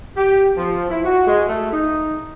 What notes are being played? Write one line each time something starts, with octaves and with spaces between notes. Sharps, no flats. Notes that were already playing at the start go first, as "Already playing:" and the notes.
G4
F3
E4
F#4
G#3
A3
D#4